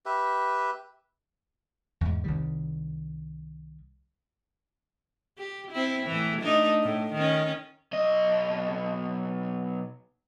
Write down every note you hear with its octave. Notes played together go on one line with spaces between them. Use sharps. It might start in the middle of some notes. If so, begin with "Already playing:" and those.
G4 B4 E5
E2 G#2
C2 D#3 G3
G4
C4 E4
A2 E3
A3 D4 D#4
A2
D#3 C#4
B1 D#5